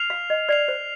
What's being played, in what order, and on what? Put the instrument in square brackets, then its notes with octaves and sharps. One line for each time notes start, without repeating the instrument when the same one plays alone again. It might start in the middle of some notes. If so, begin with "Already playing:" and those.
Already playing: [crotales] F6 C7 F7
[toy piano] F5
D#5
[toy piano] D5 [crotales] F6 C7 F7
[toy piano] C5